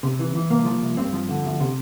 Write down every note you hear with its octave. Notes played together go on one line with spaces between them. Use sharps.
C3
E3
E3
C2 A#3
F3
C2
G2 C4
F3
D3
D2
C3